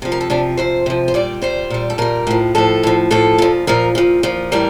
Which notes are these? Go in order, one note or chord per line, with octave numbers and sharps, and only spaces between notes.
C3 F3
A#4
A4
C3 F3 D4
C3 F3 C5
C3 F3
C5
A#2 G3 D5
A#2 G3 C5
A#2 G3
A4
A#2 G3 A#4
A2 F3
A2 F3 A4
A2 F3
A2 F3 A4
A#2 F3
A#2 F3 A#4
A#2 F3
A#2 F3
A2 E3 G3 A#4